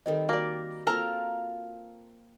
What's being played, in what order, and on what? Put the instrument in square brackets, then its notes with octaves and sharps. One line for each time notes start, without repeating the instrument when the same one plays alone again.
[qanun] D#3 G3 C4 [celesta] A4 A#4 D#5
[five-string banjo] A#3 D5 [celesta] F#4 A#6
[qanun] A#3 C4 F4 [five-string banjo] A4 A#4 A#5